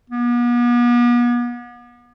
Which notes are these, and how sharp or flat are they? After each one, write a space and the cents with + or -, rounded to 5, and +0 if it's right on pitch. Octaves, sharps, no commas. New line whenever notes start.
B3 -40